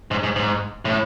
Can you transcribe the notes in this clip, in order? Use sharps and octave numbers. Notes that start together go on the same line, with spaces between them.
G#2
G#2
G#2
A2